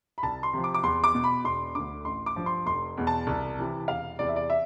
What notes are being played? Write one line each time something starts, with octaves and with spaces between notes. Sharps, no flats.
B5
C2 A5
C6
C3 F3
D6
D6
E2 C6
D6
B2
B5
E1 C6
D2 D3 D6
A1 C6
D6
G2 F3
C6
F1 C6
E2 B2
A5
C2
C3 E3
E1 F5
E2 C3 E3 D5
E5
D5
E5